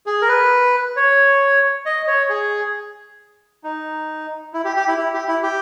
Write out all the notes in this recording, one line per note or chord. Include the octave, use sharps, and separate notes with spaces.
G#4
A#4
B4
C#5
D#5
C#5
G#4
D#4
E4
G4
G4
E4
E4
G4
E4
G4